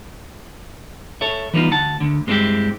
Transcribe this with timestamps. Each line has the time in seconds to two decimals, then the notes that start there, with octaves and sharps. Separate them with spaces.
1.21 A4 C#5 E5
1.54 E3 G3 B3 D#4 F4
1.71 D2 F#5 A5
2.00 D2 D3
2.27 G2 G#3 C4 D4 E4 G4